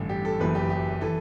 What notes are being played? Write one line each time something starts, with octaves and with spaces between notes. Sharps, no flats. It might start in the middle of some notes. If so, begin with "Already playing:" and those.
Already playing: A1 G2 D3
G4
A4
F#1 F#2 E3 B4
G4
G4
E3 A4